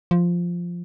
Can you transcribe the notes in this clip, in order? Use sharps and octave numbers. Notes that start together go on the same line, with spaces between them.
F3